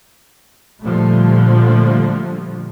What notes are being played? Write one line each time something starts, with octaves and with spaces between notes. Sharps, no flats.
A#2 D3 F3 G3 A3